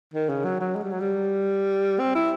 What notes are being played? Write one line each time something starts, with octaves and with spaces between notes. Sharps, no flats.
D#3
C#3
F#3
F#3
G#3
G3
F#3
G3
C4
E4